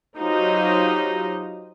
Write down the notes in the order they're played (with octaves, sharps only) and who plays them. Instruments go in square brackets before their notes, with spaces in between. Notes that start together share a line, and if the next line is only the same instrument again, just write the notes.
[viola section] F#3 D#4 F4 G4 C5 D#5